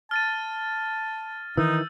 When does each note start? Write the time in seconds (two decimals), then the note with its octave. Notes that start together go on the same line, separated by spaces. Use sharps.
0.11 A5 F6 A6 D#7
1.57 D#3 E3 D#4 E6 G6